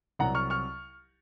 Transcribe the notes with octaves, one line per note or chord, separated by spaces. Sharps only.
C2 C3 F#3 F#5 A#5
C#6 F6
C#6 F6